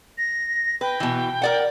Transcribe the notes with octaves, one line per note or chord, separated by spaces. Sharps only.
A#6
B4 G5
B2 E3
A#4 D5 F#5